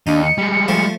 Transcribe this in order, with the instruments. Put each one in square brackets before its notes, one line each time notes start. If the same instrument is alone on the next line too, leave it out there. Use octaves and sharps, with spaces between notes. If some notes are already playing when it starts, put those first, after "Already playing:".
[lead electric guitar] D#2 [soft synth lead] D4 [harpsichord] D#4
[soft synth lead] C#7
[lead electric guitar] G3 G#3
[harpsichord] F3 A3